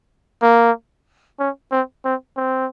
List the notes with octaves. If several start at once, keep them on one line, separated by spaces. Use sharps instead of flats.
A#3
C#4
C4
C4
C4